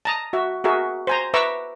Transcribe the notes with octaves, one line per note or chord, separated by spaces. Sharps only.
A5 A#5 D#6
F#4 E5
F#4 G#4 A#4 E5
C5 G#5 A#5
B4 E5 A#5 C#6 D6 E6